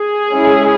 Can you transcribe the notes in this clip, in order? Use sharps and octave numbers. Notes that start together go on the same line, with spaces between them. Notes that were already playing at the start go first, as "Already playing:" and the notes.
Already playing: G#4
G#3 C#4 E4